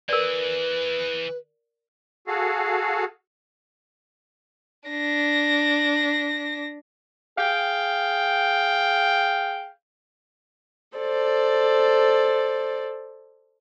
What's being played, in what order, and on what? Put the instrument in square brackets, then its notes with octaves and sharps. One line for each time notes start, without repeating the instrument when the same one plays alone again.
[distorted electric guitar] E3 G#4 [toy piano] A#4 D5 [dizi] B4
[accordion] F#4 G#4 A4 F5
[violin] D4 A#6
[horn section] G#4 F5 G5
[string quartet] A4 C5 D5